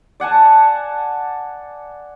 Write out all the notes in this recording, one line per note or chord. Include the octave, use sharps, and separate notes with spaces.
D5 F#5 G#5 A5